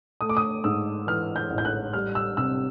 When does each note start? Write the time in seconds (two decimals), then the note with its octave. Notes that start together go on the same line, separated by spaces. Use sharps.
0.21 A3 D#6
0.29 D6
0.37 D#6
0.64 G#2 E6
1.07 E3 F6
1.36 G6
1.50 A1
1.58 G6
1.65 F#6
1.93 G3 F6
2.15 E6
2.37 C3 E6